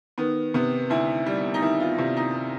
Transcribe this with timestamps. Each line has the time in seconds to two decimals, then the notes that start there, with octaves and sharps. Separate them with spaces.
0.18 D#3 B3
0.54 C3 B3
0.90 D2 E4
1.26 G3
1.54 D#4
1.62 D#3 E4
1.80 F4
1.98 C3 E4
2.16 D#4